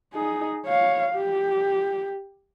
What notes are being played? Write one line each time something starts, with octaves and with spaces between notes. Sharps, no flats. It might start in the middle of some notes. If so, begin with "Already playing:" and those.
D#4 G#4
C#5 F5
G4